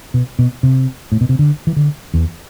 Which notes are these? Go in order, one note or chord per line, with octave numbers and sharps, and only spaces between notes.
B2
B2
C3
A2
B2
C3
D3
E3
D3
E2